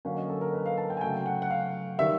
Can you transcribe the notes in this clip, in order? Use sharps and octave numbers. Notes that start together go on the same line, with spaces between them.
D3 F#3 A#3 C#4 F5
D#5
A4
A#4
B4
F5
A5
G5
G#5
C#3 F#3 A3 G5
F#5
F#5
F5
D#3 G3 E5